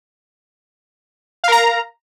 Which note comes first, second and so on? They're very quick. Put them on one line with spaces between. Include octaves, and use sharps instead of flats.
F5 A#4 A#5